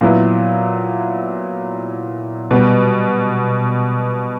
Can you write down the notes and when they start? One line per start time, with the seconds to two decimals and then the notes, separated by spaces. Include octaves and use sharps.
0.01 A#2 F#3 B3 E4
2.51 B2 G3 B3